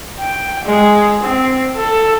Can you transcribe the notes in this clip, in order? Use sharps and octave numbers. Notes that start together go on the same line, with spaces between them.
G5
G#3
C4
A4